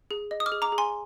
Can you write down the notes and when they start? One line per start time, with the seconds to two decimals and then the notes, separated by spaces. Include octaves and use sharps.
0.11 G#4
0.31 D#5
0.40 D#6
0.46 D6 F6
0.52 G#4
0.62 A#5 D6
0.72 G#4
0.78 G#5 C6